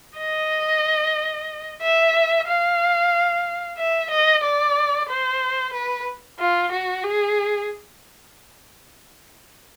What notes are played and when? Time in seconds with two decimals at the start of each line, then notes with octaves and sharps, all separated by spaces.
0.18 D#5
1.82 E5
2.48 F5
3.78 E5
4.10 D#5
4.44 D5
5.09 C5
5.73 B4
6.39 F4
6.72 F#4
7.04 G#4